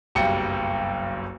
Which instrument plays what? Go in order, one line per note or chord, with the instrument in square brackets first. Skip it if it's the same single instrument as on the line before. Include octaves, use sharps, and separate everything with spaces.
[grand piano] F#1 B1 G2 G5 C#7